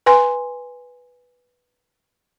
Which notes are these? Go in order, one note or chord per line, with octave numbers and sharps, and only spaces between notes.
B4 G#5 C6